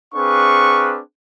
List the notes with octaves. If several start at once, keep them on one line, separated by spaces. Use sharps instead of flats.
C4 D4 G#4 B4 F5 C#6